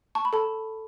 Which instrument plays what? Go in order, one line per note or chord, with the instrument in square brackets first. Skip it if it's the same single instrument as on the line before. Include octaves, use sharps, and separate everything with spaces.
[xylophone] A5 C#6
B5
A4 A5